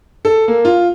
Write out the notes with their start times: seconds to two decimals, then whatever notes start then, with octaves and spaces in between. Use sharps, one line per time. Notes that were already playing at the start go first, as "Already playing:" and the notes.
0.25 A4
0.48 A#3
0.65 F4